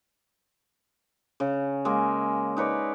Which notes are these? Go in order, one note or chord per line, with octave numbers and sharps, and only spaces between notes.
C#3
G#3 A#3
D#4 B4 C#5 D5